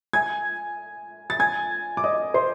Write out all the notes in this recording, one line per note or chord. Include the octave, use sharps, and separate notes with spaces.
G#5 G#6
A6
G#5 G#6
D6
D#5 D#6
C5 C6